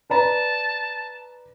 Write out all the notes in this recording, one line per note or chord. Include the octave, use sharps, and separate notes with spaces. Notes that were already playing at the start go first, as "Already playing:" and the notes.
B4 D5 A5 A#5